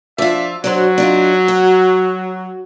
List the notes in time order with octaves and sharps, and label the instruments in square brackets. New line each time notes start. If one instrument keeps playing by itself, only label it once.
[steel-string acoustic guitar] F3 F4 [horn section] D4 D5 E5
[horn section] F#3 [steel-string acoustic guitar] D4 F#4 C5
[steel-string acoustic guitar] D4 D#4 F4
F#4